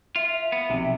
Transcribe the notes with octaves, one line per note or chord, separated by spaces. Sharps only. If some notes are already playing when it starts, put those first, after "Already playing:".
F4 E5
E5
B3
B1 F2 C3